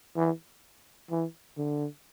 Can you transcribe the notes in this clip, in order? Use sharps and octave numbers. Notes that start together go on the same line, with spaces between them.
E3
E3
D3